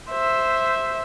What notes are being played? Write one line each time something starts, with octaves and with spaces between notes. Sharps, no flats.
C5 E5